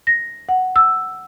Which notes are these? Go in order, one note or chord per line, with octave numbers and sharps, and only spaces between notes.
A#6
F#5
E6